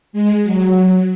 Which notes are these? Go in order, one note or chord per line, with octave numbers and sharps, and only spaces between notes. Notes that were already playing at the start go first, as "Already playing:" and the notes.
G#3
F#3